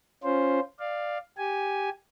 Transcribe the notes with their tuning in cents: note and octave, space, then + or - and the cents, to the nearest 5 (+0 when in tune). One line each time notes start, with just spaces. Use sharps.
C#4 +0 F4 +0 C5 +0
D5 +15 F5 +0
G4 +0 G#5 +0